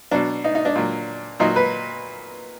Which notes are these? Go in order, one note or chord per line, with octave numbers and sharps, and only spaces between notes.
B2 F#3 D4
D#4
D#4
D4
A#2 F#3
A#2 F#3 D#4
B4